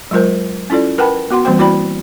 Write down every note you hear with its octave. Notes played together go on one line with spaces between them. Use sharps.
F#3 G#3 F4 A#4 C5
C#4 E4 F4 A4 D5
A#4 B4 F#5 G5 A5 B5
B3 F#4 F#5 C6
E3 G3 A#3 C4 C5 G5
E4 F#4 D5 G5 B5